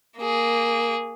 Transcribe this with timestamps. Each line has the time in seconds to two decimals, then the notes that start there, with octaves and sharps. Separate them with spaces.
0.18 A#3 G#4